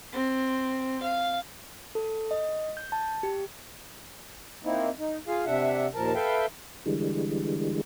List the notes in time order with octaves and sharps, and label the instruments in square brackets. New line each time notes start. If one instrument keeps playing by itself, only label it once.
[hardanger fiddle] C4
F5
[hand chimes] A4
D#5
G6
A5
G4
[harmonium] A#3 C4 D#4 E4
D#4
F4 G#4 F5
C3 D4 E5 F#5
D#2 A#2 F3 A#4 A5
A4 B4 E5 F5 G5
[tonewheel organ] D3 E3 G3 G#3